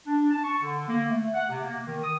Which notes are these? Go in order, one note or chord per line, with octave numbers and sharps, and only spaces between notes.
D4
A5
C#6
D3
A#3
A3
F#5
C3
A#3
D#3
D#6